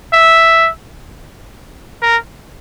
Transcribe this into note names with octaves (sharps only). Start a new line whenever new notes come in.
E5
A#4